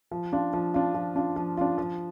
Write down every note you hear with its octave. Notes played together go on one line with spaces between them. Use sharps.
F3
D4 F4
F3
D4 F4
F3
D4 F4
F3
D4 F4
F3